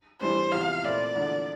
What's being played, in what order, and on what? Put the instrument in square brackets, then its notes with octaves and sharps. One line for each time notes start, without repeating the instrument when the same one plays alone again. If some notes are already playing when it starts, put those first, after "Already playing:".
[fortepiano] A2 E3 G3 D4 [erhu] C5
[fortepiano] E2 C3 F3 [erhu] F5
[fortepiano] A#2 A3 C4 E4 A#4 [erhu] D5
[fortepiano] E2 D3 F3 A#3 D4